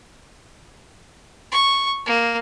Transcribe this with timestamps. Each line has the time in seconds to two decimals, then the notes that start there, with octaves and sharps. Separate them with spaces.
1.52 C#6
2.06 A#3